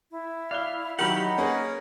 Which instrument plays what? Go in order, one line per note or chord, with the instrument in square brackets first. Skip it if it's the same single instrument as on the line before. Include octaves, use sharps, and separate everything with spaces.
[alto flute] E4
[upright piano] D5 F#6 G7 [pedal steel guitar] F5
[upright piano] D#3 F#3 A#4 [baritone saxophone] G4 [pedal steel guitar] F#5 B5
[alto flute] D#4
[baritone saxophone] A#3 [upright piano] C#4 G#4 B4